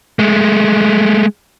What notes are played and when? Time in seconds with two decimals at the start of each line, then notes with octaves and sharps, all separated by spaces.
0.19 G#3 A3